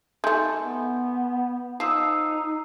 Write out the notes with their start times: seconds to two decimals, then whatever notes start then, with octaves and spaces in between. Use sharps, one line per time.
0.24 D#3 A3 G#5 C6 G6
0.60 B3
1.80 F3 D#4 D#6 E6 C7